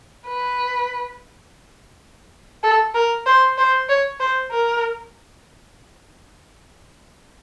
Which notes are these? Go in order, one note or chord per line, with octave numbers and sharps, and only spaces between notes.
B4
A4
A#4
C5
C5
C#5
C5
A#4